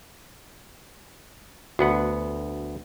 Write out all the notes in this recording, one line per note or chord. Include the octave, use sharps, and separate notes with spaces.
D2 B3 F#4 F#5